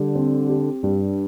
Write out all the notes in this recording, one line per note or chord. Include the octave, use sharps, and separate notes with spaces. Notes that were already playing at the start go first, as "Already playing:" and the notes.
Already playing: D3 G3
C4
G4
G2 G3